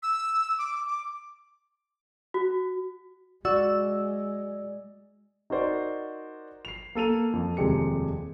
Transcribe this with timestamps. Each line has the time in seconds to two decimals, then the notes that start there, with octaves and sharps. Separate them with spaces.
0.03 E6
0.58 D6
0.88 D6
2.34 F#4
3.45 G#3 F#4 D5 E6
5.50 D#4 F#4 A#4 C5 D5 F#5
6.65 C7 F7
6.95 A#3 A4 D#7 F7
7.33 F2
7.57 D#1 F2 C3 G#3 G4 C#7